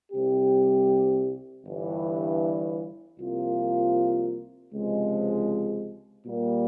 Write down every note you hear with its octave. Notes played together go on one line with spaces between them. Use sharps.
C2 C3 G3 C4 G4
G1 G2 E3
C2 C3 F3 A#3 F4
C#2 C3 F3 G#3
A#2 G3 A#3